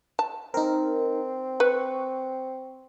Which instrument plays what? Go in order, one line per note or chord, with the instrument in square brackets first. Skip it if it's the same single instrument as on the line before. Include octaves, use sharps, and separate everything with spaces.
[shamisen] A5
[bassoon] C4 [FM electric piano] D#4 A#4
[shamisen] B4 [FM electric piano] C#6